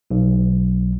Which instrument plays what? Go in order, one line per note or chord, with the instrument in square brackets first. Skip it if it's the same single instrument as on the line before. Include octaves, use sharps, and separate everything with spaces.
[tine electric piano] B1